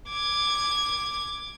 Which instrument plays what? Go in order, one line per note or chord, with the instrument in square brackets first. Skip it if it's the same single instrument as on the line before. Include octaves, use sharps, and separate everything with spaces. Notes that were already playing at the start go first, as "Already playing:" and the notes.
[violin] D6 G#6